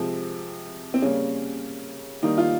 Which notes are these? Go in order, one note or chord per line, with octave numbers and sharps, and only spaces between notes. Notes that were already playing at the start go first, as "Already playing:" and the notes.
Already playing: C3 F3 G#3 C4
C4
C#3 G3 A#3 C#4
D#3 G3 A#3 D#4
F4